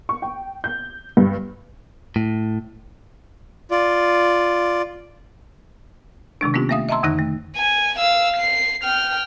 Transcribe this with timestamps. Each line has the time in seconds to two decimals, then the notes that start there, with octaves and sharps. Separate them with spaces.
0.09 C#6
0.22 G5
0.64 G6
1.17 G2
2.16 A2
3.71 F4 D5
6.41 C3 D#3 G#3 D4
6.53 C3 A#3 B3 C#4 F4 G4
6.69 A3 A#3 E5 F5 D#6
6.89 D#5 E5 A5 A#5 C6 E6
7.03 F2 D3 D#3 D#4 F#6 A#6
7.18 A3
7.57 G#5
7.98 F5 E6
8.37 C7
8.84 G5 F6